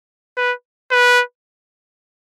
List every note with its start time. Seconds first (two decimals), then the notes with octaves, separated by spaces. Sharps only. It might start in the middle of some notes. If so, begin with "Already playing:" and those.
0.37 B4
0.91 B4